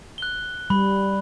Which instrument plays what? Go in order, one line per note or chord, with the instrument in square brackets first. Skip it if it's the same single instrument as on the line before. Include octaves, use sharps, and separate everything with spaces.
[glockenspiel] F#6 G7
[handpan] G3 [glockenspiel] B5